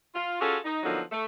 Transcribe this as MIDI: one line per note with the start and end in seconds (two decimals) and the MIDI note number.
0.14 0.39 65
0.40 0.57 61
0.40 0.57 65
0.40 0.57 66
0.40 0.57 68
0.40 0.57 69
0.64 0.82 63
0.83 1.00 50
0.83 1.00 53
0.83 1.00 54
0.83 1.00 58
0.83 1.00 59
0.83 1.00 63
1.11 1.24 57